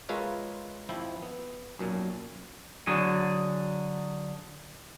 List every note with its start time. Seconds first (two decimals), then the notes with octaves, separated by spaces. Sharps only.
0.09 G#3 F4 A#4 B4 C#5 E5
0.89 G#1 F3 E4 G5
1.22 B3
1.79 B1 F#2 A#2
2.87 D3 F#3 G#4